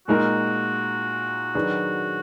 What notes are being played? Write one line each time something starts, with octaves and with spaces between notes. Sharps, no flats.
A#2 G#3 D#4 F#4 A#4
D#3 F#3 D4 G#4 B4